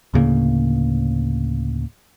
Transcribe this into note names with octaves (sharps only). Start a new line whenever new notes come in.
D2 A2 C#3 A#3